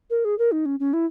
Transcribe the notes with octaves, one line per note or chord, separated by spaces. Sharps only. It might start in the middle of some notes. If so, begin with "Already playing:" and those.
A#4
G#4
A#4
D#4
C#4
C#4
E4